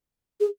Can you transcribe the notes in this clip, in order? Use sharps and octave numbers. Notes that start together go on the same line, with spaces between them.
G#4